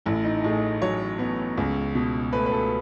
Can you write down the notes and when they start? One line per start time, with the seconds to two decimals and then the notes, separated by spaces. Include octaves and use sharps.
0.06 A1 E4
0.24 D#4
0.44 A2 G#4
0.82 F#3 C#5
1.19 B3
1.57 C#2
1.95 B2
2.33 A3 B4
2.46 B4
2.52 A4